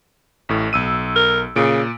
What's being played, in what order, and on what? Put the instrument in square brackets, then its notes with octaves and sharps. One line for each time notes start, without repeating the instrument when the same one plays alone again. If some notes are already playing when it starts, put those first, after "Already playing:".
[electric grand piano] A1 A2
B1 E6 D#7
[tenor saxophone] A#4
[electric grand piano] A#2 D7 [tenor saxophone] C#3